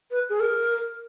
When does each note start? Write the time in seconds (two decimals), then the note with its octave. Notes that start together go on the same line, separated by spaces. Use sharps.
0.11 B4
0.29 G#4
0.40 A#4